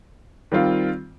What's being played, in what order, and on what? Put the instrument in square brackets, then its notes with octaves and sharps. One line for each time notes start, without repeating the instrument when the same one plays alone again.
[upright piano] D#3 G3 C4 F4